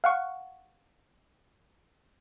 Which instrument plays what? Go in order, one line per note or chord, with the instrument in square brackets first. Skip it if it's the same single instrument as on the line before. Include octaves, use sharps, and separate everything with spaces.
[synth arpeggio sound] F5 F#5 C#6